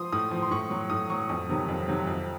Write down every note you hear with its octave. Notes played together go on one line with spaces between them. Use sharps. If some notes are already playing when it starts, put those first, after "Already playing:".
Already playing: F3 C6 D#6
A2 D#6
F3
C6
A2 C#6
F#3
A2 D#6
F#3 C#6
F2 D#6
C3 D#3 F#3
F2
C3 D#3 F#3
F2